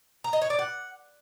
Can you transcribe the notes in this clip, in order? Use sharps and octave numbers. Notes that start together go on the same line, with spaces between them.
A#5
D#5
C#5
D5
F#5